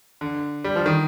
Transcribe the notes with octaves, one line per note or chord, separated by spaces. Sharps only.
D3
G3
F3
D#3